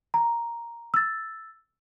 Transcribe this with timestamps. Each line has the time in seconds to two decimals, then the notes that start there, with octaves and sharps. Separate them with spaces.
0.14 A#5
0.94 E6 A6